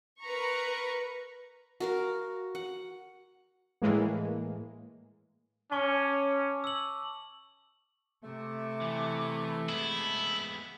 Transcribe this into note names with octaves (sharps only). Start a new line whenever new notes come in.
A#4 B4 A#5 C#6
F#4 A#4 F5
F#5
A2 E3 G#3 A#3
C#4 A5 C#6 D6
E6 F#7
C3 A3
E3
G#3 B3 E4